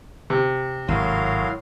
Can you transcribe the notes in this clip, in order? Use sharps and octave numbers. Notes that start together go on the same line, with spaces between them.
C3
G#1 A2 F#3 A#4 F5 C6